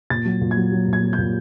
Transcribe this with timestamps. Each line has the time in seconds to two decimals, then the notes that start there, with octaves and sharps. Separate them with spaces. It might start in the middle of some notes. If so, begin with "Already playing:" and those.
0.10 A#2 A6
0.25 F#3
0.41 A#2
0.51 G#6
0.57 F#3
0.72 F#3
0.88 A#2
0.93 G#6
1.03 F#3
1.13 G6
1.18 A#2